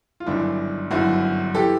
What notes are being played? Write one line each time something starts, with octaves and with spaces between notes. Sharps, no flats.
F4
G1 F#2 D#3 D4 E4
G1 F#2 D#3 E4 F#4
E3 G4 A4